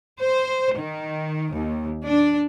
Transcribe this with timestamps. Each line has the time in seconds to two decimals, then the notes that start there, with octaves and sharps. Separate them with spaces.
0.20 C5
0.77 D#3
1.54 D#2
2.05 D4